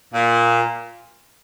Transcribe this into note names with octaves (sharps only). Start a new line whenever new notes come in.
A#2